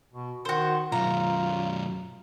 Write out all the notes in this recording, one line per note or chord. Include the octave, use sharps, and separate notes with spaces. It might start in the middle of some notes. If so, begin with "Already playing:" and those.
B2
D#3 F#4 C5
B1 F#2 F4 A#5